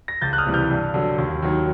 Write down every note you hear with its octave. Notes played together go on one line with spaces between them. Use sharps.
A#6
C#2 G6 A6
F#6
D#6 F6
C3 E3 G3
F6 G6
G2
D3 F#3
D#2
D#3 F#3